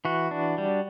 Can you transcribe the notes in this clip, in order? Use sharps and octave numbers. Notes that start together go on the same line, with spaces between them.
E3 F#4
D4
G3